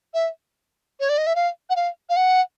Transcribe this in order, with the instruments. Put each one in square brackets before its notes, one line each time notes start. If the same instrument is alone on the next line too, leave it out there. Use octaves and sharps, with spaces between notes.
[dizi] E5
C#5
D5
D#5
E5
F5
F#5
F5
F5
F#5